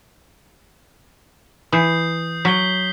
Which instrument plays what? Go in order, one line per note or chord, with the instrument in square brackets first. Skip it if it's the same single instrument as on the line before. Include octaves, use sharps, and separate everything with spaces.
[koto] E3 [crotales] D#6 G6 C7
[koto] F#3 [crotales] B6 G7